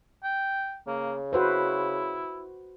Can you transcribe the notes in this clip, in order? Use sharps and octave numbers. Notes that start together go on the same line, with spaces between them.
G5
C#3 A#3
E4 F#4 B4 C5